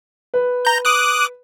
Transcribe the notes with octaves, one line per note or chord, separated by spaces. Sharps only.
B4
A#5 G6
D6 D#6 F#6